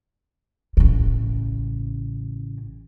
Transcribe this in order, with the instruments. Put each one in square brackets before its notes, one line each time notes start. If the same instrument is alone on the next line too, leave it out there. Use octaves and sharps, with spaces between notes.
[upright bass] A1 C#3